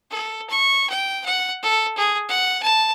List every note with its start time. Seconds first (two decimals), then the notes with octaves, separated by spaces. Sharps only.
0.11 A4
0.50 C#6
0.90 G5
1.26 F#5
1.63 A4
1.97 G#4
2.29 F#5
2.63 A5